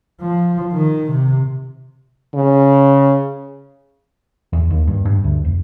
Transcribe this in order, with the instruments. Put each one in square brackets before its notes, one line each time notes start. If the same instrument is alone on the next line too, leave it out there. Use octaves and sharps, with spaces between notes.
[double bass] F3
D#3
C3
[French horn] C#3
[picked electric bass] E2
D#2
G2
G2
D2
F1